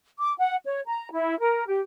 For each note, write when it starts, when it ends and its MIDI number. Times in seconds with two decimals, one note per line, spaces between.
0.18 0.32 86
0.38 0.56 78
0.65 0.79 73
0.87 1.09 82
1.12 1.38 64
1.39 1.63 70
1.67 1.80 67